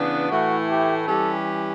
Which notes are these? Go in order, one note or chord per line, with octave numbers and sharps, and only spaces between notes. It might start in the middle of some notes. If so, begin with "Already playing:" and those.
Already playing: C#3 E3 B3 D4
A2 E3 A3 E4 F#4
G4
E3 G3 C#4 G4 A4